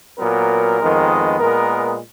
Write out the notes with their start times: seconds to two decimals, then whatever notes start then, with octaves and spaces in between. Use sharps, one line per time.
0.18 A#2 F#3 B3 A#4
0.80 F2 D#3 G#3 B3
1.39 A#2 G#3 B3 A#4